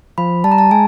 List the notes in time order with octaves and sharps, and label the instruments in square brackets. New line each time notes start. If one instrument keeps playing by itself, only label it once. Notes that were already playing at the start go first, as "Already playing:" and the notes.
[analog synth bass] F3 [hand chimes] B5
[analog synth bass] G3 [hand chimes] A5
[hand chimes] A#5
A5
[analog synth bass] G#3 [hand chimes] G#5